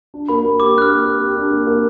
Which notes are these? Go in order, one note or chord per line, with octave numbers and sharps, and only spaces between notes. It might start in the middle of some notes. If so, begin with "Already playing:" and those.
D4
A#3 B5
A#3
G4 D6
D4 F#6
F6
A#3
A#3
G4
D4
A#3
A#3